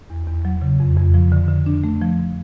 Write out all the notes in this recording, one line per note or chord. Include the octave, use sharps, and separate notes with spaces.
E2
E2
F#3
C#3
F2
F2
F3
D3
D3
D4
A3
F3